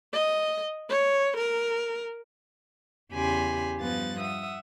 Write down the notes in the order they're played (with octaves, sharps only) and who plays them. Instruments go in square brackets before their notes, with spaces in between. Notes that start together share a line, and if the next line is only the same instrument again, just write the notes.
[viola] D#5
C#5
A#4
[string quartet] E2 C#3 G4 G#5 B5 C6
G2 F3 G3 B3 F#6 A6
E5 F#5 D#6